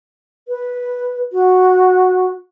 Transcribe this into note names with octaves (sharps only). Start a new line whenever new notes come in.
B4
F#4